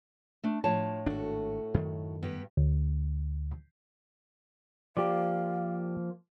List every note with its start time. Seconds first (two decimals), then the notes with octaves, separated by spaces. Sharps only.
0.43 A3 D4
0.64 A2 F3 C#5 A5
1.06 G#1 A3 D4 F#4
1.74 F#2 D#3
2.23 G2 B3 G4
2.57 D2
4.97 F3 A#3 G4 D5 F5